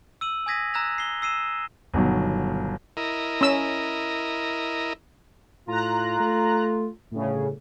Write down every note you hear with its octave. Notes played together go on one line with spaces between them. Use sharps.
E6 D#7 F#7
G#5 D#6 G#6 A#6 B6 D#7
A#5 E6 F#6 G#6 A#6 F7
C7 G7
E6 C7 D#7 E7
G1 B2 D#3 F#3
E4 A#4 D#5
C#4 E6
A2 F4 A#5 F#6
A3
G1 A2 C#3